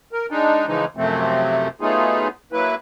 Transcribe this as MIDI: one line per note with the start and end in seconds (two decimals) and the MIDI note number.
0.12 0.26 70
0.31 0.66 56
0.31 0.66 62
0.31 0.66 63
0.67 0.85 49
0.67 0.85 52
0.67 0.85 53
0.67 0.85 56
0.67 0.85 63
0.97 1.68 42
0.97 1.68 48
0.97 1.68 53
0.97 1.68 57
0.97 1.68 60
1.81 2.28 54
1.81 2.28 57
1.81 2.28 59
1.81 2.28 63
1.81 2.28 65
1.81 2.28 68
2.52 2.75 54
2.52 2.75 58
2.52 2.75 64
2.52 2.75 71